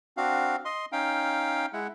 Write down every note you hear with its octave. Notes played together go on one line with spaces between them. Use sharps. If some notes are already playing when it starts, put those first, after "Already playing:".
C4 D4 F#4 F5
D#5 C6
C#4 D#4 F5 G5
G#3 E4 F#5